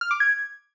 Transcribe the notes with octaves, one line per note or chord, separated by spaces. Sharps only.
F6
D6
G#6